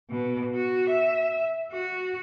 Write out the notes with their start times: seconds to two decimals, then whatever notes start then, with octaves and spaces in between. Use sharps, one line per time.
0.10 B2
0.55 F#4
0.89 E5
1.72 F#4